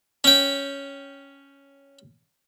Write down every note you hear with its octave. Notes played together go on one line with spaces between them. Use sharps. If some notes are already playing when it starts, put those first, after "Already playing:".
C#4 G5